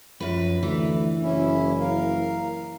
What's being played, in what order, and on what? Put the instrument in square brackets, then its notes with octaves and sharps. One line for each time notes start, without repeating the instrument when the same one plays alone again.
[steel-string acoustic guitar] F#2 B4 [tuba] F3
[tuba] D2 [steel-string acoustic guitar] E3
[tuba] F#1 [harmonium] C#4 E4
[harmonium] A#4 F5